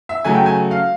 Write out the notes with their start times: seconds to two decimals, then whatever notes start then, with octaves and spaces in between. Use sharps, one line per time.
0.09 E5
0.24 C#3 F#3 A3 G#5
0.35 G5
0.46 G#5
0.71 F5